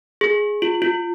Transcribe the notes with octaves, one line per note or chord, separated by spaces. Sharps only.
G#4
F4
F4